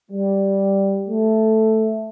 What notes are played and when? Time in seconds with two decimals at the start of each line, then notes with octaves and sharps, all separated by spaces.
0.10 G3
1.08 A3